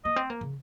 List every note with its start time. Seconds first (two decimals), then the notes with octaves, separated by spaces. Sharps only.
0.04 A#3 D#5
0.16 C4
0.30 A#3
0.41 C#3